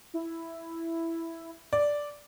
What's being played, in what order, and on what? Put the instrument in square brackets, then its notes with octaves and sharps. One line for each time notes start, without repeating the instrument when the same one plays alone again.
[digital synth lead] E4
[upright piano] D5